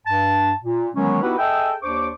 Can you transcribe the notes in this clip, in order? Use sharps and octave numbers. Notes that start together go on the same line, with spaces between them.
G2 A5
A#2
D#3 E3 F#3 G#3 B3 C#4
B3 D#4 E4 F#4 G4 B4
G#4 A4 D#5 E5 G5
D#2 D4 C5 C#6 D6